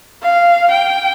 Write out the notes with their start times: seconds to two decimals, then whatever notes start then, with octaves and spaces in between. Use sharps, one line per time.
0.22 F5
0.71 G5